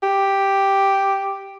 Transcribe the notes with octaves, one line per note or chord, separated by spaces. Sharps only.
G4